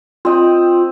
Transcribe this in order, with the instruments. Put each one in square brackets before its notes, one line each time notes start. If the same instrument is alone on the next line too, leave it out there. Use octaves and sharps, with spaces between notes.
[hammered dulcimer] C4 D#5 G5 [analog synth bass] F4